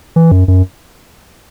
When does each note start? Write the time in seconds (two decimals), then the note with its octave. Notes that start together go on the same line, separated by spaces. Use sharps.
0.16 E3
0.32 F#2
0.48 F#2